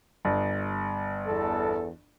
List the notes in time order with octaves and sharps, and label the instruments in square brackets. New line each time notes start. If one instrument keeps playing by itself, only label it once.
[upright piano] G1
[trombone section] E2 A4